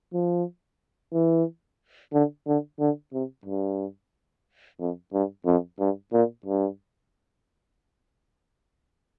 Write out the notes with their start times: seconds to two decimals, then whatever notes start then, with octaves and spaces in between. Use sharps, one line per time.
0.13 F3
1.13 E3
2.13 D3
2.47 D3
2.80 D3
3.13 C3
3.45 G2
4.80 F2
5.13 G2
5.46 F2
5.79 G2
6.13 A#2
6.46 G2